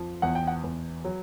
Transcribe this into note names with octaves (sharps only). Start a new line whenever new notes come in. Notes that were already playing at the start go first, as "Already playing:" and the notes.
Already playing: F2 F3
E2 F#5
G5
F#5
E2
F#3